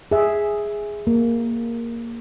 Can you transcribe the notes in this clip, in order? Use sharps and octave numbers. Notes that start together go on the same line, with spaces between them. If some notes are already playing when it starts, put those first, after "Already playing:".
G#4 E5
A#3